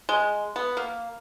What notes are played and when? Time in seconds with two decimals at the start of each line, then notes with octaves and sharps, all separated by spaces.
0.09 G#3
0.56 B3
0.77 A#3